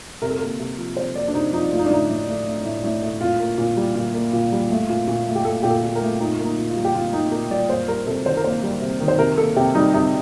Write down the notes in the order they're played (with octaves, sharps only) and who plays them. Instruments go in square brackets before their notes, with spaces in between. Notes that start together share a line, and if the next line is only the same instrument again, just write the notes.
[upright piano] C3 A#4
A4
A#3 A#4
C3
F3
C3 C5
A#3 D5
D4
C3 D#4
F3 D#4
A3 F4
D#4
D4
A2 D#4
A2
A3
A3
A2
A2
A3
A#2 F4
A#3
A#2
G3
A#2
A#3
A#2
G3
A3
A#2
A#2
A3
G4
A3 A4
A#2 G4
A4
A#2
A#4
A3
A#2 D#4
A#3
D#4
A#2
F4
G3
G4
A#2 F4
A#3 D#4
A#2 A#4
G3 D5
A#3 C5
G3 A#4
C3 A4
D#3 C5
A#4
A#3 C5
G3
C3
D#3
C5
C3 A#4
A#3 A4
C3 G4
G3 D#4
C3 D#4